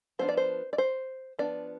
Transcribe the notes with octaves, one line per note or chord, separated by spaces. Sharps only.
F3 B3 D4 C5
D5
C5
D5
C5
F3 B3 D4 D5